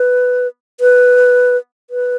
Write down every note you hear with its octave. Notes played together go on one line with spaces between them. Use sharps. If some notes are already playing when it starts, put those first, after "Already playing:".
Already playing: B4
B4
B4